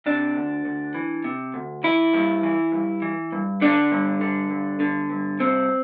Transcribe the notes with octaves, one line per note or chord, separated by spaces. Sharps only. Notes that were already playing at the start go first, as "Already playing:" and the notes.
C3 D4
D2
D2
E3
C3
D2
E3 E4
G2
E3
G2
E3
G2
D3 D4
G2
D3
G2
D3
G2
C3 C4